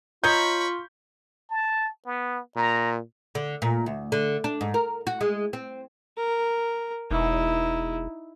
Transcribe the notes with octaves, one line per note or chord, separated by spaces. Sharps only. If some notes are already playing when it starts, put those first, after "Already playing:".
F4 C#5 D#5 A#5 B5 C#6 G6
A5
B3
A#2 A#5
D3
A#2
D2
D3
D4
G#2
A#4
F#4
G#3
C4
A#4
E1 D#4 E4